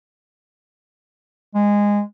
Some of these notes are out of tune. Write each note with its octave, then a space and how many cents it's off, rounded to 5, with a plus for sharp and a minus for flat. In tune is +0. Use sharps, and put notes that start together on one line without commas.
G#3 -15